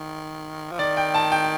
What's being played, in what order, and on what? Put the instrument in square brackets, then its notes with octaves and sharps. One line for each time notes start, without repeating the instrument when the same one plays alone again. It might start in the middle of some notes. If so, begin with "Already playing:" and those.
Already playing: [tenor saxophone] D#3
F3
[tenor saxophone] D#3 [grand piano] D5
[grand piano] G5
A5
G5